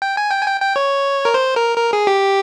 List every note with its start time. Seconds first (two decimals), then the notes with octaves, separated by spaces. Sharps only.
0.02 G5
0.17 G#5
0.31 G5
0.41 G#5
0.47 G5
0.61 G5
0.76 C#5
1.25 A#4
1.34 C5
1.56 A#4
1.77 A#4
1.93 G#4
2.07 G4